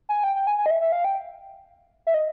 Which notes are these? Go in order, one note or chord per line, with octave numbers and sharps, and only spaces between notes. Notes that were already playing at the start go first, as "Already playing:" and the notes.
G#5
G5
G5
G#5
G#5
D#5
E5
E5
F5
G5
E5
D#5